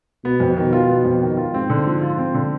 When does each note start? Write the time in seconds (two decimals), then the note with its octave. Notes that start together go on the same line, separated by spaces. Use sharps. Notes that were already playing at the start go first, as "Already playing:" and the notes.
0.25 B2 B3
0.40 F2
0.57 B2 D#3
0.73 F4
0.89 B3
1.05 F2
1.22 D#3
1.37 F4
1.54 G#2 C4
1.70 D3
1.86 F3
2.01 F4
2.18 C4
2.35 D3